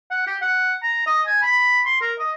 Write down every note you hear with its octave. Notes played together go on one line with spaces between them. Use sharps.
F#5
G4
F#5
A#5
D#5
G#5
B5
C6
A#4
D#5